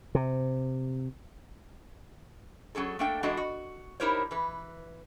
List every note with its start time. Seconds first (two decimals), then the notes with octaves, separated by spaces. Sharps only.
0.15 C3
2.75 F#3 C#4 G#4 A4
2.99 A3 A#3 D4 A4 G5
3.23 E3 G#3 D4 F#4 A4 D#5
3.37 F#4
4.00 D#4 E4 G4 A#4 C5 C#5
4.31 E3 B4